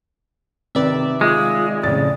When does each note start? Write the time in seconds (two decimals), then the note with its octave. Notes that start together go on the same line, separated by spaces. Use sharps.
0.75 C3 D#3 B4 D5 E5
1.21 G#3 F4
1.83 F2 A2 C#3 D5 A6